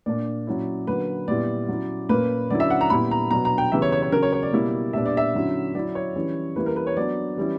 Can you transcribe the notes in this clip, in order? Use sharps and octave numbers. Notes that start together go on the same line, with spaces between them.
A#2 A#3 D4 D5
A#2 F#3 C#4 E4
D3 F#3 A#3 B4
A#2 G3 B3 E4 D5
F#3 C#4 E4
A#2 A#3 C#4 B4
D3 F#3 C#4 E4 D5
E5
F#5
A#5
A#2 G3 B3 E4 B5
A#5
B2 F#3 B3 D4 A#5
A#5
G5
C#3 E3 G3 B3 E5
C#5
C#5
C#5
C#3 F#3 C#4 A#4
C#5
C#5
D5
B2 G3 A#3 E4
A#2 G3 B3 D4 E5
D5
E5
D3 F#3 C#4 E4
F#3 C#4 E4 D5
C#5
E3 G3 C#4 E4
E3 G3 A#3 E4 B4
A#4
B4
C#5
F#3 B3 D4 D5
E3 G3 C#4 E4